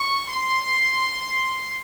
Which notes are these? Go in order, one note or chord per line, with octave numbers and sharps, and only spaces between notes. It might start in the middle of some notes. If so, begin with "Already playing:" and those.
Already playing: C#6
C6